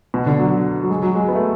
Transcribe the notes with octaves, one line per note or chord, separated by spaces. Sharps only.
B2
D3
F#3
F#3
G#3
F#3
G#3
B3
A3